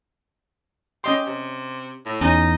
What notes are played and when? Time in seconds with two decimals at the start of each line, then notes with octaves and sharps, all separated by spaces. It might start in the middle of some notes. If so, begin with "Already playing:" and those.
1.04 C#4 G4 D#5 C6
1.26 C3
2.06 A2
2.21 E2 C#4 D#4 G#5